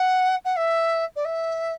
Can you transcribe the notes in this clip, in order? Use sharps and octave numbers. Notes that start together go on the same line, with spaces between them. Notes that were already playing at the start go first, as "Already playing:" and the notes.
Already playing: F#5
F#5
E5
D5
E5